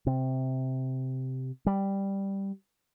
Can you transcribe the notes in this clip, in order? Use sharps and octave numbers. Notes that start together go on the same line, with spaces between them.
C3
G3